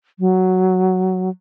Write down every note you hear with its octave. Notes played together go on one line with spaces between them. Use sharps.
F#3